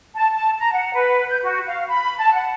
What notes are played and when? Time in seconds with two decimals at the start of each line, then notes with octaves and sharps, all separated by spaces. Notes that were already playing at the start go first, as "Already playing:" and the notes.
0.16 A5
0.33 A5
0.58 A#5
0.72 F#5
0.94 B4
1.29 G6
1.44 F#4
1.67 F5
1.88 B5
2.19 A5
2.33 F#5